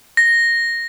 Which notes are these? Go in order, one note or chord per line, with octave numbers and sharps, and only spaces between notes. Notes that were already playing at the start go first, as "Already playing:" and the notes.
A#6